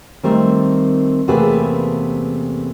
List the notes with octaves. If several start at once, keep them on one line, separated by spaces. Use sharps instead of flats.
D#3 G3 A3 C4 A#4
E2 C3 A3 A#3 G#4 B4